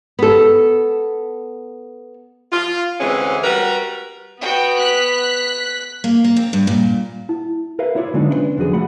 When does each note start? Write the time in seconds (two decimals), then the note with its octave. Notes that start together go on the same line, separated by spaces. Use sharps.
0.19 B3 A4
2.52 F4
3.00 D2 E3 G#3 C4 C#4
3.44 G3 F#4 A#4 B4
4.41 B3 F#4 G5
4.78 F#6 B6
6.04 A#3
6.24 A#3
6.36 C4
6.53 G2
6.67 A#2
7.29 E4
7.79 A#4 B4 E5 F5
7.96 E4 F4 C#5 D5
8.14 D3 F#3 G#3 B3 D4 D#4
8.30 C#4 D4 E4 G4 B4 C5
8.57 E2 D3 F3 F#3 F#4 G#4
8.73 A3 F#5 B5